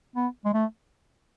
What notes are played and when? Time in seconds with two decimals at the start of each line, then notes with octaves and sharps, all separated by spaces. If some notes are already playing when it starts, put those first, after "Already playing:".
0.16 B3
0.45 G#3
0.54 A3